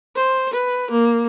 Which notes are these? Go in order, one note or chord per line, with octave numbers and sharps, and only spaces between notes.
C5
B4
A#3